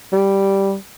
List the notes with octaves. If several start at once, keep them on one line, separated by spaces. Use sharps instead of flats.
G3